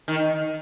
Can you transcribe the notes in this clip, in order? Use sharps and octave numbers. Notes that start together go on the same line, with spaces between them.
D#3